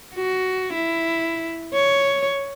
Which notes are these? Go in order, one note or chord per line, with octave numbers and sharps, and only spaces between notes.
F#4
E4
C#5